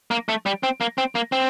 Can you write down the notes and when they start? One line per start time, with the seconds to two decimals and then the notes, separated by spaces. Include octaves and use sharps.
0.11 A#3
0.29 A3
0.46 G3
0.63 C4
0.81 A#3
0.98 C4
1.15 A#3
1.32 C4